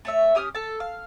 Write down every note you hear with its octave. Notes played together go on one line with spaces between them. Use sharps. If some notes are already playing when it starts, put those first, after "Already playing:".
A3 C#5 E5
C#4 G4 D#6 F6
A4 A5
F5